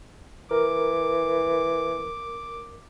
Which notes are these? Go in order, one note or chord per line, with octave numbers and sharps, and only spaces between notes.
E3 A#4 D6